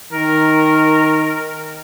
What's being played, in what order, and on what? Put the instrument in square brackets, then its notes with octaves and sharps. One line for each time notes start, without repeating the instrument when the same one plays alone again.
[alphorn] D#3 [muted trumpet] A#4